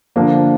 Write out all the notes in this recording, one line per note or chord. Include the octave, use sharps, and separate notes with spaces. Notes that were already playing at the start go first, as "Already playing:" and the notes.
D3 F3 A#3 D4